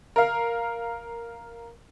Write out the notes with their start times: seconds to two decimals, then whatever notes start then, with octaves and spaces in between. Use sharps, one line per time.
0.16 A#4 F5